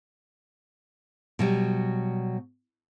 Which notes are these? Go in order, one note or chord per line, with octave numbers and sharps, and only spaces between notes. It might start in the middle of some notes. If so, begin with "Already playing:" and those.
B2 F#3 G3